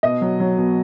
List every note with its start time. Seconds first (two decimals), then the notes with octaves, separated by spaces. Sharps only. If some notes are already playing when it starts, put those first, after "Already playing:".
0.03 B2 D#5
0.21 F#3
0.40 F#3
0.58 B2